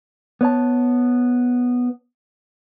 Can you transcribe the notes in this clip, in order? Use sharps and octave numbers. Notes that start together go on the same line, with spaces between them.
B3 C#5 A5